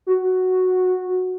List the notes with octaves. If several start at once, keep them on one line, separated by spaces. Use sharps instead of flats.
F#4